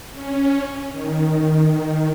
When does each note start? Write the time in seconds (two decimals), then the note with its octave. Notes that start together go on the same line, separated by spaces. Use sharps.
0.12 C#4
0.92 D#3